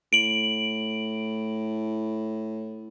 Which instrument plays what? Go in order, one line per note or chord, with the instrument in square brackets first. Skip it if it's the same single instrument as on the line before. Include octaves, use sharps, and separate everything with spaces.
[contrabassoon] A2 [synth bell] D7 F#7